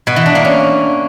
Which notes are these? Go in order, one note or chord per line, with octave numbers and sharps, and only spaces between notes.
B2
E3
D4
A#3
C#4